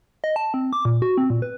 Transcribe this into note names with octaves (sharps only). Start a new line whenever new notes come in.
D#5
A5
C4
D6
A#2
F#4
C4
A#2
B4